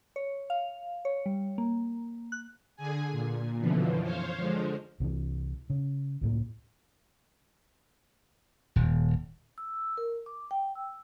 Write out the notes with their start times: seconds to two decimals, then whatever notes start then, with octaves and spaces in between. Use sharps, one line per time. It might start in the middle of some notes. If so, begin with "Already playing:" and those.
0.16 C#5
0.50 F5
1.05 C#5
1.26 G3
1.58 A#3
2.32 F#6
2.76 D3 G#4 G#5
3.12 A#2
3.59 F#2 B2 D3 E3 F3
4.03 C5 C#5 F5
4.37 D3 F3 G#3
5.00 C2 C3 D#3 E3
5.70 C#3
6.21 C#2 A2 A#3
8.76 D#1
9.58 E6
9.98 A#4
10.26 D6
10.51 G5
10.75 E6